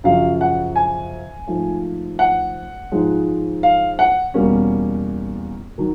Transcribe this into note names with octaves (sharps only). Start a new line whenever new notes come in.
F#2 C#3 F3 F5
F#5
G#5
G#2 F3 A3
F#5
G#2 F3 G#3
F5
F#5
E2 B2 G3 A#3 C#4
D#3 F#3